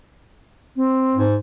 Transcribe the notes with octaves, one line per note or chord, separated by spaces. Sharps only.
C4
G#2